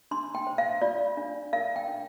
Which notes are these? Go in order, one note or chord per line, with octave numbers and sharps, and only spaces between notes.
D4 C6
G5
C5
F5
F4 D5
D4
A#4 F5
G5
D4